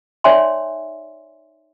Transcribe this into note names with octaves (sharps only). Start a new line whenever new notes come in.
D#4 C#5 D5 E5 G#5 C6